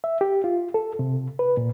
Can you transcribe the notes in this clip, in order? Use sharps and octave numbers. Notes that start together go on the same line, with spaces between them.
E5
G4
F4
A4
C3
B4
A#2